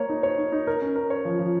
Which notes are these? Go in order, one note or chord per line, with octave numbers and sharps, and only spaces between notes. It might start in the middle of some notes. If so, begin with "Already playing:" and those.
Already playing: A#3 A#4 C#5
D#4
C#5
D#4
D#4
A#4
C#4
A#4
C#5
F3
F3